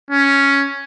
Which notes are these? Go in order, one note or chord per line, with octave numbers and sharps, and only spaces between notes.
C#4